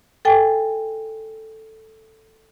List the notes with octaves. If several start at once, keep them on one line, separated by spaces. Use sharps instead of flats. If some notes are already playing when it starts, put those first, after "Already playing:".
A4 G5 G#5